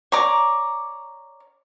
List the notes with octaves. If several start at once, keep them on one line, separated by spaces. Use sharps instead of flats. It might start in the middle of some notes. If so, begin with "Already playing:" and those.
C#5 D5 A#5 D6